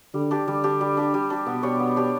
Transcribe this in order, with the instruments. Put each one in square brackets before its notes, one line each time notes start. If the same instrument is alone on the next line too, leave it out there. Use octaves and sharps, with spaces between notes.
[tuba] D3 [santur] G3
[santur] D4 G4
[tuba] D3 [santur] G3
[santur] D4 G4
G3
D4 G4
G3
D4 G4
[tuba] B2 [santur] B3
[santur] D4 G4 C#5
B3
D4 G4 C#5